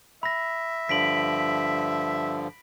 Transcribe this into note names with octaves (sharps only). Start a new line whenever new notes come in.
E5 B5 A#6
G2 D3 F3 B6 D7 F#7